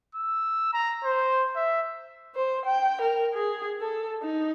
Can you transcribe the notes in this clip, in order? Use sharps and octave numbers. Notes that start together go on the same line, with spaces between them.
E6
A#5
C5
E5
C5
G5
A#4
G#4
A4
D#4